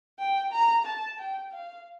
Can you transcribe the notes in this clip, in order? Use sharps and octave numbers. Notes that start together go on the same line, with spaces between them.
G5
A#5
A5
G5
F5